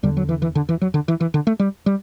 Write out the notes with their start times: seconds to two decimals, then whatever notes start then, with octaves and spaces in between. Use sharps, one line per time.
0.03 E2 D3 G3
0.17 F#3
0.29 E3
0.42 E3
0.55 D3
0.69 E3
0.81 F#3
0.94 D3
1.08 E3
1.20 E3
1.34 D3
1.47 A3
1.59 G3
1.86 G3